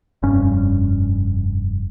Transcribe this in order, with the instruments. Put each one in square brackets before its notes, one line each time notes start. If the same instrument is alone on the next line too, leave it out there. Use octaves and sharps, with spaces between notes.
[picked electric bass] F1 G2 C#4